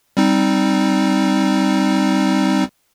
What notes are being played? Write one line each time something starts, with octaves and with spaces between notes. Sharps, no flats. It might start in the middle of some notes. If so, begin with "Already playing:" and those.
G3 C4 D#4